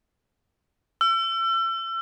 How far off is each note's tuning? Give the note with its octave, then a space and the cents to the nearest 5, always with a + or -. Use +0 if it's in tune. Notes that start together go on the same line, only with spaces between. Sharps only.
E6 +35